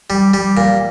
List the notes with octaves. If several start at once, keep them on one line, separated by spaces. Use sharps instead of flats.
G3
G3
A#2